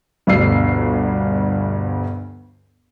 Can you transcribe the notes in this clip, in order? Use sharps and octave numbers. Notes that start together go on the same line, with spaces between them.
G1 D2 G2 B2 E6 C7